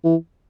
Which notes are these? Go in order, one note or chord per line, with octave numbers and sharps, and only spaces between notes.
E3